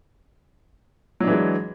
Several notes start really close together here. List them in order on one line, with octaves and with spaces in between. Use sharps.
F#3 D4 E3 G#3